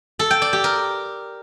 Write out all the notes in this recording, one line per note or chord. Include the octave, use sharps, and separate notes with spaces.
A4
G5
D5
G4
A#4